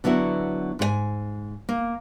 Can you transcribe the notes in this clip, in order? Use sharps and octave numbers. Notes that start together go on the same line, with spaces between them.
D3 F#3 B3 E4 F#4
G#2 G#4 G#5
A#3